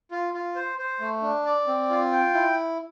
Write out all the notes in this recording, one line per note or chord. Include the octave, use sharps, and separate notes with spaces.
F4
F4
C5
C5
A3
D4
D5
C4
F4
G5
E4